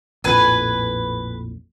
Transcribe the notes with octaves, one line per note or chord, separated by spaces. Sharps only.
A#1 F2 A2 B4 G#5